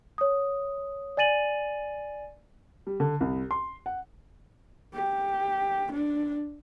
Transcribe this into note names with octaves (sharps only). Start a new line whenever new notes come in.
C#5 D#6
D5 G#5 A6 D#7 F#7
G3
D3
C2
C6
F#5
G4
D4